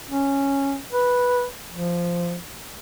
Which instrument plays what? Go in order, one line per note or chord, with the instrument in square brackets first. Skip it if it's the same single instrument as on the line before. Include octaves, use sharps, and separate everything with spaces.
[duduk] C#4
B4
F3